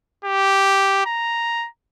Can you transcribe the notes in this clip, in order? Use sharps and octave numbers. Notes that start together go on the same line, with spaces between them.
G4
A#5